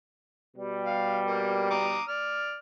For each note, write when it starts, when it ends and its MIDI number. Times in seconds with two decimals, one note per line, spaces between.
0.56 1.96 47
0.56 1.96 55
0.86 1.18 77
1.26 1.70 58
1.71 2.03 82
1.71 2.03 86
1.71 2.03 87
2.08 2.57 74
2.08 2.57 89